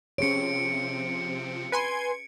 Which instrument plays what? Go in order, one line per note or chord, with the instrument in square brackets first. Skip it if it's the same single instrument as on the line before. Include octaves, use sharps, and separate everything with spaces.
[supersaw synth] C3 F3 C4 [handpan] C#4 G#4 C#5 [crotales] C#7 D7
[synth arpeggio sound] B4 G#5 C6 [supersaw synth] G#6